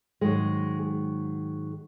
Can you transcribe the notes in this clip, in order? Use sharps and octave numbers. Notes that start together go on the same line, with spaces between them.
G#2 D#3 F#3 G#3